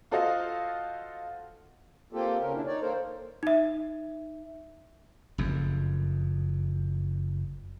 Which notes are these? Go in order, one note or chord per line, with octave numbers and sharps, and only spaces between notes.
F4 F#4 A4 C5 D#5 F5
A#3 C4 F4 G4 A4
C#3 C#4 A#4
B2 D4 E4
D#4 C#5 D5
D#3 A#3 A4 A#4 C5
D#4 E5
F#1 F2